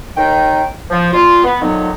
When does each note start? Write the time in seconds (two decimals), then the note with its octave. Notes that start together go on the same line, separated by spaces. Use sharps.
0.16 D#2 D#3 A#4 G5
0.90 F3
1.13 A#2 F4
1.43 B3
1.61 D3 D#3 F3 F#3 B3 D#4